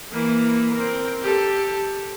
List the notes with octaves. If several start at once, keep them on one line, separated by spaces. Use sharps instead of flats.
E3 A#3
C4 A#4
G4 A4